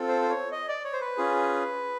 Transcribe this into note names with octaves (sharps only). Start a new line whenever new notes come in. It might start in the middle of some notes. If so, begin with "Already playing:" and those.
Already playing: C4 F4 A4
C5
C5
C#5
D#5
D5
C#5
C5
B4
C#4 F4 G#4